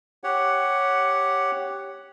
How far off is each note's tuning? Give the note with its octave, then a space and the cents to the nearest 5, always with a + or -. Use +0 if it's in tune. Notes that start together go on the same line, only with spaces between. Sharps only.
G4 +0 C#5 +0 F#5 +5